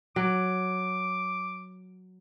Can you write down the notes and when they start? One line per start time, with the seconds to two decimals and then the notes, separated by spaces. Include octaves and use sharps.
0.16 F#3 D6